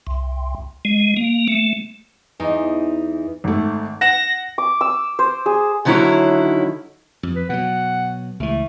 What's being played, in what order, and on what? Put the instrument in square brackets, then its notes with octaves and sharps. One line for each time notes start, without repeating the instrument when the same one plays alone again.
[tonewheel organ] C2
G#3
A#3
A3
[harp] E2 D#4
[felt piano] G#1 A3
[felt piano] F#5 E7 [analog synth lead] A#6
[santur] D6
E6
C5
G#4
[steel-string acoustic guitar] D3 D#3 F#3 C#4 E4
[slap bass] F2
[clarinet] B4
[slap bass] B2 F#3 [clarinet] F#5
[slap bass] C#2 E3 [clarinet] A3